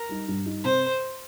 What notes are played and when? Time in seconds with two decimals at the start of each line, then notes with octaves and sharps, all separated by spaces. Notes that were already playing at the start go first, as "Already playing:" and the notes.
Already playing: A#4
0.09 G3 D#4
0.28 G2
0.45 G3 D#4
0.64 C3 C5